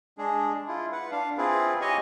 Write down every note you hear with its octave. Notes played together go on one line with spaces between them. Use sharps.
G#3 D4 G#4
E4 F4
B4 F#5
D4 F5
C4 E4 F4 G#4 B4
G4 C#5 D#5 G#5 C#6